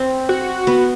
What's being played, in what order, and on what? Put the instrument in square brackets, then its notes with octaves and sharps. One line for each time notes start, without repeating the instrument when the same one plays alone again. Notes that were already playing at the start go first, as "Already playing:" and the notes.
Already playing: [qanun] C4
[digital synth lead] F#4
[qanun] B3